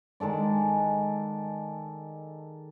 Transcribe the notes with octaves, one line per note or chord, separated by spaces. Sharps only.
D#3 G#3 A4 D5